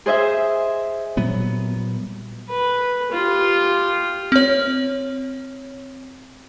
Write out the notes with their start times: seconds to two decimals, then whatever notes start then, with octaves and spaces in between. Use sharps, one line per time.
0.06 G#4 C5 D#5 E5 G#5
1.17 A#2 F#3 G3 B3
2.50 B4
3.11 F4 G4
4.32 C4 C#5